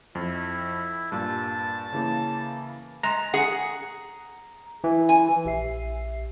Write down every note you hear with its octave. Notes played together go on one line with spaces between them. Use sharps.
F2 E4
G2 A#2 A5
C#3 E3 A#3
G#3 A#5
G#4 F#5
E3
G#5
A#1 G4 E5 C7